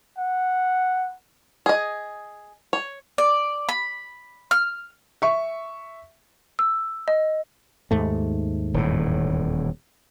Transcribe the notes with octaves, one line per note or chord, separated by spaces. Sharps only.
F#5
G#4 D#5
C#5
D5
B5
F6
E5 C#6
E6
D#5
D#2 G#2 A3
D#1 E2 A2